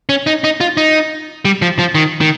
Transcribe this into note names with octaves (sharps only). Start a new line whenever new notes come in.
C#4
D#4
D#4
F4
D#4
G3
F3
F3
D#3
D#3